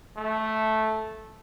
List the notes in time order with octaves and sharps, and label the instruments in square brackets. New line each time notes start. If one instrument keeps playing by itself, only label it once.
[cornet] A3